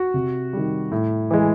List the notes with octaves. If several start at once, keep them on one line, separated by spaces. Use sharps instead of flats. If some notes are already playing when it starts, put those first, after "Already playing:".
Already playing: F#4
C3
D#3 G3
A2
E3 G#3